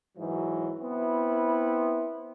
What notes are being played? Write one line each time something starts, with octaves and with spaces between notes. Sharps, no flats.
G#2 E3 F#3
B3 C4 E4